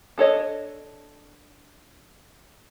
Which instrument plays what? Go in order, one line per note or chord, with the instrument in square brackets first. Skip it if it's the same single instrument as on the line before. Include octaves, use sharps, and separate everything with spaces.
[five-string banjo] D4 A4 C#5 D#5